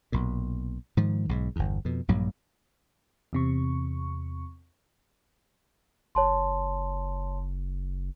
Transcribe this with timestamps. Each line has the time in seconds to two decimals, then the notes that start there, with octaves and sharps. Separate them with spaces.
0.12 B1 A#2
0.97 G#2 D#3 F3
1.29 B1 G#2
1.56 G1 E2
1.85 F2 B2
2.08 A#1 G2 A#2 F#3
3.33 E2 C3 C#6
6.15 F#1 C#5 A5 C6